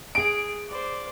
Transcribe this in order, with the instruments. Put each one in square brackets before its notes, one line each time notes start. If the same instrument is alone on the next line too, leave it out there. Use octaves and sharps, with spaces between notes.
[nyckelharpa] G#4 [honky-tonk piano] D7
[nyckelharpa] C5 D5